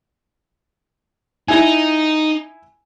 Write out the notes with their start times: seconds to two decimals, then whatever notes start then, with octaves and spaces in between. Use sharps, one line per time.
1.48 D#4 E4 G#5